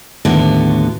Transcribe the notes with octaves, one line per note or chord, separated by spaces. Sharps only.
D#2 A2 D3 B3 F#4